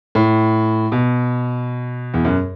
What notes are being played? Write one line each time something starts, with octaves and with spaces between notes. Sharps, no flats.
A2
B2
E2
F#2